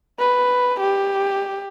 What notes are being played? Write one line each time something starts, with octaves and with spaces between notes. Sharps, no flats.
B4
G4